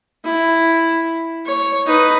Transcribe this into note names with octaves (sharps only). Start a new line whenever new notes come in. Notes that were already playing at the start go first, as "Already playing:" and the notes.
E4
C#5
D#4 B4